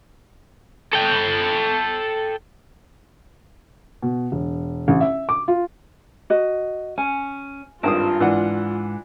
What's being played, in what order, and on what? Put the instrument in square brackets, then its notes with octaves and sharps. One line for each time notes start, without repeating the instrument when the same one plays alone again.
[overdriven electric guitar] A4 G5
[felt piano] B2
E1
A1
E5
D6
F4
[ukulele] F#4 D#5
[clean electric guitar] C#4 [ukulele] G#5
[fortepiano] G#1 G2 D#6 [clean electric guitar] C4 [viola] F4
[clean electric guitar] G#2 [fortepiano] E3 D4 F#5